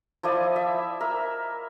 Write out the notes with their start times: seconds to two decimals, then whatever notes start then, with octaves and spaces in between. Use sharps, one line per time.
0.23 F3 E4 D5 D#5
0.56 E5
1.00 A#4 E5